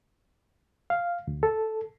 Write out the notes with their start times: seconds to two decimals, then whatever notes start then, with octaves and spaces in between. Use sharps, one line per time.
0.90 F5
1.27 D2
1.43 A4